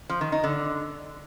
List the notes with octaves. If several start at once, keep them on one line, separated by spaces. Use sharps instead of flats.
F3
D#3
D#4
D3